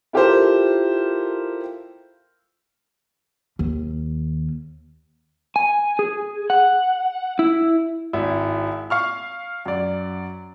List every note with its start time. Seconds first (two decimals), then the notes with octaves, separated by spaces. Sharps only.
0.13 E4 F4 G4 A4 A#4 C5
3.59 D#2
5.56 G#5
5.99 G#4
6.50 F#5
7.39 E4
8.13 G#1 E4
8.90 F5 C#6 F6
9.66 F#2 D5